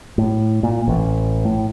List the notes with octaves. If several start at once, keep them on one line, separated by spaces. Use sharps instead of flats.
A2
A#2
A1
A2